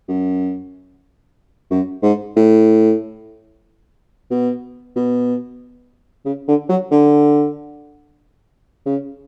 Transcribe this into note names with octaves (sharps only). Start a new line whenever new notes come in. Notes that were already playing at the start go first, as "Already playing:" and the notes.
F#2
F#2
G#2
A2
B2
B2
C#3
D3
F#3
D3
C#3